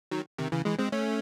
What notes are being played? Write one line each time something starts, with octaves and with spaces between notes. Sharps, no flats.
D#3 F#3
C3 D#3
C#3 E3
E3 G#3
G#3 C4
A3 C#4